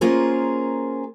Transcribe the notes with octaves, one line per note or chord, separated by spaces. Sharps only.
A#3 C#4 F4 G#4 A#4 C5